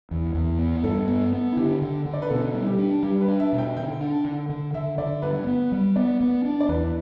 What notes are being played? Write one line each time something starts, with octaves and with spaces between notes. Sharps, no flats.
E2
E2
B3
G2 A4
B3
B3
E4
D3 G4
D3
D3
D5
B4
B2 A4
G3
G4
D4
G3 G4
B4
D4
E5
B2
G5
D3 G5
D4
D3
D3
D3 E5
D3 D5
G2 B4
B3
G3
B3 D5
B3
D4
D5
E2 B4